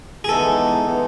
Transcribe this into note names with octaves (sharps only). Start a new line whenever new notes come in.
G#4
E3 G#3 B3 D#4 A4
E3 G#3 B3 D#4